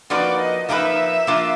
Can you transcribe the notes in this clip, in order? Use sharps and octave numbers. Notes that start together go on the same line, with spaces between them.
F3 A#3 D#4 F#4 B4 D5
D#5
F3 A#3 D#4 F#4 B4 E5
F3 A#3 D4 F4